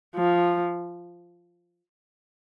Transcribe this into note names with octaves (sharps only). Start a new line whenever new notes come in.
F3